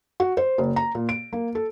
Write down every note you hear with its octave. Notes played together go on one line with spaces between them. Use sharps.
F#4
C5
F#1
A#5
A#2
D7
A#3
A4